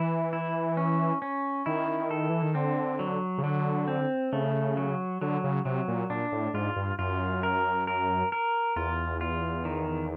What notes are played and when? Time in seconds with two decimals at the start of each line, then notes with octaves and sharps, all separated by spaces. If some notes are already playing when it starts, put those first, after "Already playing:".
Already playing: E3 E4
0.33 E4
0.77 C#4
1.22 C#4
1.66 D#3 E4
2.11 A4
2.30 E3
2.43 D#3
2.55 D3 C4
2.99 F#3
3.38 C#3
3.43 D3 F#3
3.88 C4
4.33 C#3 A3
4.77 F#3
5.22 D3 F#3
5.44 C#3
5.65 C3 F#3
5.88 A#2
6.10 A#2 D4
6.32 A2
6.54 G#2 F4
6.76 G2
6.99 F#2 F4
7.43 A#4
7.87 A#4
8.32 A#4
8.76 E2 F4
9.21 F4
9.65 D#3